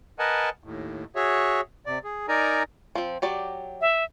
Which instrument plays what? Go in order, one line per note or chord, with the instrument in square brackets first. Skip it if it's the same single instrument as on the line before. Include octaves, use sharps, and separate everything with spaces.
[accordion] A#4 B4 D#5 F#5 G#5 A5
D#2 A2
F#4 G#4 C#5 E5
C3 D5
G#4
D#4 A#4 D5 G#5 A#5
[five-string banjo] F3 C4
F#3 G4 D5
[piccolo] E5